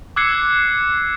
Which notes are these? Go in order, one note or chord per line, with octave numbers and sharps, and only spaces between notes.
D6 E6 F#6 G#6 C7 C#7